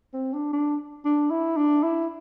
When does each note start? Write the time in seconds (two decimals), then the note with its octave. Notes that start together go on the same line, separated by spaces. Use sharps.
0.14 C4
0.33 D4
0.52 D4
1.05 D4
1.31 E4
1.57 D4
1.83 E4